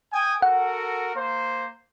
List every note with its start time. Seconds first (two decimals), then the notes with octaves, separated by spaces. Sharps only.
0.13 G5 G#5 D#6
0.42 F#4 A4 A#4 F#5
1.15 A#3 C5